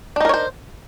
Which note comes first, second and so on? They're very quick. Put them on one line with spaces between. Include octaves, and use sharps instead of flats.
D4 D#4 A#4 C#5 C5